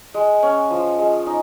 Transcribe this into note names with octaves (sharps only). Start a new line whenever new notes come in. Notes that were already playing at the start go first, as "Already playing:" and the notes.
G#3
C#4
F3
G#3
D#4